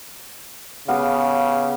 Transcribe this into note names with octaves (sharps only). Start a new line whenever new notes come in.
C#3 B3 G4 F5